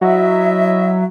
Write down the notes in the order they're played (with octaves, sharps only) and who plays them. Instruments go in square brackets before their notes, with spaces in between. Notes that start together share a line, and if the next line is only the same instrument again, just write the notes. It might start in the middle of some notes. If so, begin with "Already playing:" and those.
[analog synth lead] F#3 [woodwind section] E4 D#5 E5